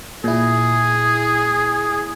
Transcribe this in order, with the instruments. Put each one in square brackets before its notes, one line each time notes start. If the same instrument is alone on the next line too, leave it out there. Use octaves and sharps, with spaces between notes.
[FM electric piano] A#2 E4 [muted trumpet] G#4